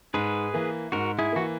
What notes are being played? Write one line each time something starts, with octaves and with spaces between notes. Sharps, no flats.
G#2 G#4 B4
E3 A#3
G#2 F#4 A#4
E4 G#4
E3 A#3 F#4